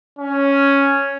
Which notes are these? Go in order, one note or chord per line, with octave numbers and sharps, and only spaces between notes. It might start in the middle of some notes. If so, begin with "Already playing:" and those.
C#4